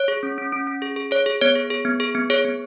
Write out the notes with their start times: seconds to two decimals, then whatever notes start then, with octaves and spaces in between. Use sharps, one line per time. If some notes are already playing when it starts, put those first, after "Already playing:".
Already playing: C#5
0.08 G#4
0.23 C#4
0.38 C#4
0.53 C#4
0.67 C#4
0.82 G#4
0.96 G#4
1.11 G#4 C#5
1.26 G#4
1.41 B3 C#5
1.56 G#4
1.70 G#4
1.85 B3
2.00 G#4
2.15 B3
2.30 G#4 C#5
2.45 B3